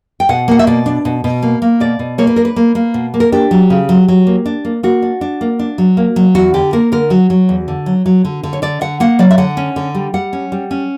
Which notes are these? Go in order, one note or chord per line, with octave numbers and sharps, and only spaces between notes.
G5
B2 F#5
A#3 F#5
E5
B2 D5
D4
B2
B2
A#3
A#3
B2 D5
B2
A#3 C#5
B4
D4 A#4
B4
A#3
A#3
B2
A#3
A#4
D4 G4
F#3
C#3
F#3
F#3
A#3
D4
A#3
A#3 F#4
D4
D4
A#3
D4
F#3
A#3
F#3
E2 F#4
D3 G4
A#3 A#4
D3 A#4
F#3 F#4
F#3
E2
D3
F#3
F#3
D3
D3
C#5
D3 D5
D3 F#5
A#3 F#5
F#3 D5
E5
D3 F#5
C#4
D3
G3
G3 F#5
C#4
G3
C#4